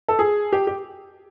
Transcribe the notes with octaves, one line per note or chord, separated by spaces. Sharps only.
A4
G#4
G4
G4